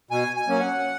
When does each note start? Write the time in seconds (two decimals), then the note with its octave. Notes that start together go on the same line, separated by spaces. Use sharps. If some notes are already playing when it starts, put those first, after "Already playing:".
0.11 B2 G#5
0.36 G#5
0.48 F#3 A#3 C#4
0.60 F#5